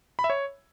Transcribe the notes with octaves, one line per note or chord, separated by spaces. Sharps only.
B5
E5
C#5